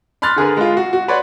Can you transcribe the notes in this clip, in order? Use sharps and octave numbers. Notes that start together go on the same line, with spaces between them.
B5 C6 F6 F#6 A6
D3 G#4 A#4 B4
G#3 F4
F#4
F#4
B4 C#5 D5 F#5 C6